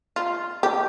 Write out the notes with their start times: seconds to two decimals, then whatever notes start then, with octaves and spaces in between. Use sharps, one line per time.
0.16 F4
0.63 G4